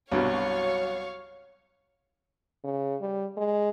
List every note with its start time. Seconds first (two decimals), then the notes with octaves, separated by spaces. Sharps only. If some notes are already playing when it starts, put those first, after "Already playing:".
0.12 C2 G2 B2 F#3 C#5 F5 C#6
2.64 C#3
3.01 G3
3.37 G#3